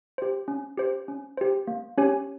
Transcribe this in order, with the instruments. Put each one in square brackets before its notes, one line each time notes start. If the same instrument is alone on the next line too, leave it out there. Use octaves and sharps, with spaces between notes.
[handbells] G4 C5
C#4
G4 C5
C#4
G4 C5
A#3
C#4 G4 C#5 G#5